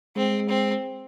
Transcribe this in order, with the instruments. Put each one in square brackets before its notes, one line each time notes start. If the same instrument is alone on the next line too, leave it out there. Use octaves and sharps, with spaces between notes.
[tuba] G#3 [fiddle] C4
[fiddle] C4